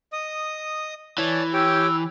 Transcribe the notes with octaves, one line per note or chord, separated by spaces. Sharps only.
D#5 D#6
E3 C#5 D5 A5
G4 C#5 G5 E6